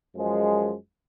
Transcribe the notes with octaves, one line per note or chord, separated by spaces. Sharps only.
F#2 F3 G#3